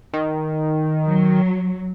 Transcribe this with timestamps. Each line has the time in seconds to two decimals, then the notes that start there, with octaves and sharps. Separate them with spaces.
0.14 D#3
1.06 F#3